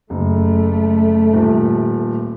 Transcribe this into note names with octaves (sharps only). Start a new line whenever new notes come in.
F#1 A3
D#1